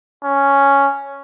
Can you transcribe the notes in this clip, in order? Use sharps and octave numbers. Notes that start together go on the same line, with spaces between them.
C#4